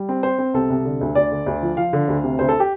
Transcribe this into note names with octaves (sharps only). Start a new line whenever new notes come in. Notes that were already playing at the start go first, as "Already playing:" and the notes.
Already playing: G3
C4
C4 C5
C4
C2 A4
C2
D3
D2
D2 D5
D3
D2
F3
F3 F5
D3
D2
C3
D2 C5
A4
G4